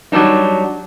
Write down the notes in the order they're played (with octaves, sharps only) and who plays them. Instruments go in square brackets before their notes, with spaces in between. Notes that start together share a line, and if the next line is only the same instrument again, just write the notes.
[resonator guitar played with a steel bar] F#3 G3 C4 D4 D#4